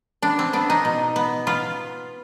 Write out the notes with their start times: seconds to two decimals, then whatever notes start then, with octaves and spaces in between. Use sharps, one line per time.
0.22 B3 D4
0.39 C4
0.53 B3 D4
0.70 D#4
0.85 B2
1.16 B3
1.47 B3 F4